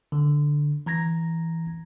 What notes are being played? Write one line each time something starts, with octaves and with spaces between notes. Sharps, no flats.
D3
E3 A#5 G#6 A#6